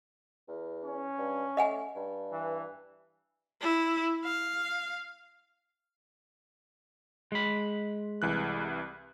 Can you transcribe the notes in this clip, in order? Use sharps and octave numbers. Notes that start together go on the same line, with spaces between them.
E2
C#4
G2
A3 D#5 F#5 G#5
G2
E3
E4
F5
G#3 B5
C2 E3 F#6